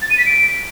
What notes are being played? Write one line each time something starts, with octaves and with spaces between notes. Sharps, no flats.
A6
D#7
B6
D7